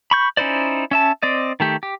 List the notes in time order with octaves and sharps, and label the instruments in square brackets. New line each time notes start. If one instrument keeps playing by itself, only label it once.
[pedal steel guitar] B5 C#6 G6
C#4 D#4 E4 C5 D5
C#4 E5 A5
C4 D5 D#5
D#3 A3 G4
G4